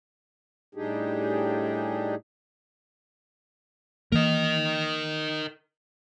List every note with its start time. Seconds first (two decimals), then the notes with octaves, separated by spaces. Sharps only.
0.75 A2 G3 D4 D#4 G4 G#4
4.12 E3 A#3 A#4 D#5